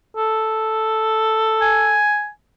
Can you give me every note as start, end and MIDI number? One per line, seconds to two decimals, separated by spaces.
0.17 1.99 69
1.62 2.29 80